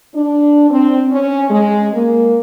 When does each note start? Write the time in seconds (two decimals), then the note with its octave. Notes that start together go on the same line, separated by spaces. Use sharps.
0.15 D4
0.70 C4
1.10 C#4
1.49 G#3
1.94 A#3